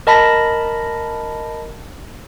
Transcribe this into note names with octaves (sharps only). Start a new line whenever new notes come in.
A#4 D#5 A5 B5 A#6 B6